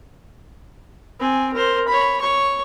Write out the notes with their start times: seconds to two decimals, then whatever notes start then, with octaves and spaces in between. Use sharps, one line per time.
1.20 C4 G#5
1.53 A#4 C5
1.88 C#5 B5
2.21 C#5 C#6